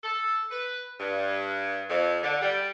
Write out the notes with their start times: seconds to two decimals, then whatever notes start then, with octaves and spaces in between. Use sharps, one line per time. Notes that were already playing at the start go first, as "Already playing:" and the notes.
0.03 A4
0.51 B4
0.99 G2
1.89 F2
2.23 D3
2.42 G3